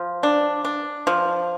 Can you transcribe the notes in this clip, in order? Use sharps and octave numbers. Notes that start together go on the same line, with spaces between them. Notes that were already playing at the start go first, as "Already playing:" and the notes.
Already playing: F3
D4
D4
F3